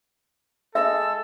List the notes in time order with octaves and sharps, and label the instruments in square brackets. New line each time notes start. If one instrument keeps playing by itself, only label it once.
[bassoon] G#3 [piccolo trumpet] A4 [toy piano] E5 [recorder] E6